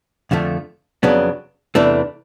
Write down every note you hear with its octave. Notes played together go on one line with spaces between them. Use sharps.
F2 D3 F3 A3
F2 C#3 F#3 B3 D4
E2 C3 E3 A3 D4